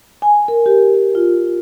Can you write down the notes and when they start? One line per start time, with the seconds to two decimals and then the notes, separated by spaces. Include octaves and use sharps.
0.22 G#5
0.48 A#4
0.66 G4
1.15 F4